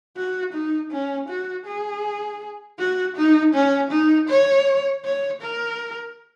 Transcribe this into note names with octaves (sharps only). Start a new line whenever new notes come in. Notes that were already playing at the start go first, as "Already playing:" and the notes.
F#4
D#4
C#4
F#4
G#4
F#4
D#4
C#4
D#4
C#5
C#5
A#4